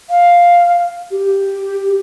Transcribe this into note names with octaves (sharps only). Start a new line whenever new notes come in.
F5
G4